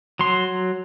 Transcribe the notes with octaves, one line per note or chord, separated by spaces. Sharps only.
F#3 C6